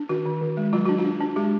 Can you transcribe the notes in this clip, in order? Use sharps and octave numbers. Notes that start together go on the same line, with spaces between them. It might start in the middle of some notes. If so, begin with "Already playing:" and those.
Already playing: D4
D#3 F#4
D#3
D#3
G#3
F#3 F4
D4 F#4
F4
D4
D4
G#3 G4